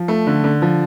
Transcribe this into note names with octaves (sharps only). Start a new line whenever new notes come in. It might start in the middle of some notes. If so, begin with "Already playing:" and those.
Already playing: F3
A3
D3
D3
F3